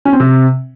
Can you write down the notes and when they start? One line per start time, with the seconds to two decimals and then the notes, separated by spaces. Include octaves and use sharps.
0.05 C#4
0.13 C4
0.20 C3